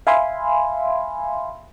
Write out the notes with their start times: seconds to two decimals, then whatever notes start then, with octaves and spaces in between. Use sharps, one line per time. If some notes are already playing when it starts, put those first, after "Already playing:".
0.07 E5 F5 G#5 B5 C6